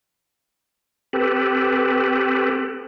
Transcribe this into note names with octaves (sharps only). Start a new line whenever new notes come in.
C4 G4 A4 B4